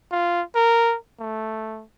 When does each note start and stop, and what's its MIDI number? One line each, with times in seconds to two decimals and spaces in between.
0.12 0.43 65
0.55 0.96 70
1.20 1.84 57